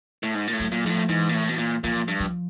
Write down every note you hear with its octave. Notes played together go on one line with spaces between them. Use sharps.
A2
G#2
A#2
A2
F#3
A#2
G#2 F3
A2
G#2 E3
A#2
A2
B2
A#2
A#2 F3
G2
F3